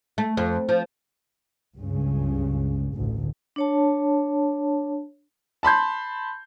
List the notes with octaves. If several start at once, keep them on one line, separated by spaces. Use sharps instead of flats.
A3
F2
F3
C#2 G2 C#3
A1 D2
D4 C#5 A5
A5 B5 C6 G6